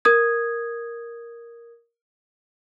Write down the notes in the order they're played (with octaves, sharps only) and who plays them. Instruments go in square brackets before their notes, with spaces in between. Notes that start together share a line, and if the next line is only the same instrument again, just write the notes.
[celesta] A#4 D#6 G#6